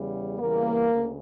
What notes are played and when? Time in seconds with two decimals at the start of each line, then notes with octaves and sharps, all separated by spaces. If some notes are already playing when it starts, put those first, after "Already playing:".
Already playing: E2 C#3 G3
0.39 E2 C#3 E3 G3 A#3
0.89 D2 C#3